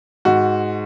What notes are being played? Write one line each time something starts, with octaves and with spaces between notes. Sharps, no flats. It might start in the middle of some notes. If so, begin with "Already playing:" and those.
G#2 F#4